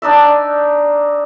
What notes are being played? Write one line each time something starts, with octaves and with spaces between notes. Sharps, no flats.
D4 D#4 D5 E5